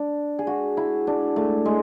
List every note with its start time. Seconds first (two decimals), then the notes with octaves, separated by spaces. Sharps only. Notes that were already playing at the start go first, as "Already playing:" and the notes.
Already playing: D4
0.39 G#4
0.47 F#4
0.77 E4
1.07 D4
1.36 A3
1.65 G#3